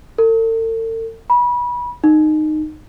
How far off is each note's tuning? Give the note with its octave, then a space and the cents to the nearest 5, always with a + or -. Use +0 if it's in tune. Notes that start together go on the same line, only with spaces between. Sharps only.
A4 +45
B5 -25
D#4 -15